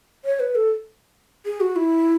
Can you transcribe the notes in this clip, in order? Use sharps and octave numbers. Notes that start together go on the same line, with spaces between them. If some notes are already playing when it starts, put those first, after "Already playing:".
C#5
B4
A4
G#4
F#4
E4